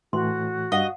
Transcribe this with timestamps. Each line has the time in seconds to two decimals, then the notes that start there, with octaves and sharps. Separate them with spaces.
0.13 A2 E3 F#4 C6
0.72 G2 D#5 F5 F#5